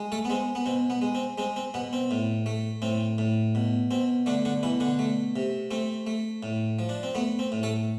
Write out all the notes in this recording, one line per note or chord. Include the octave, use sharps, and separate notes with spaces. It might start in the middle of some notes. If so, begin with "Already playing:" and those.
Already playing: G#3
A3 A4
B3
G#3 C4
B3
B2 C4
B3
G#3
C4
G#3 C4
C4
B2 B3
C4
A2
A3
A2 C4
A2
B2
B2 C4
D3 A3 D4
D3 D4
B2 E3 E4
D3 D4
A3
C3
A3 C4
A3
A2
F3
D4
C4
A3 B3
C4
A2
A3 A4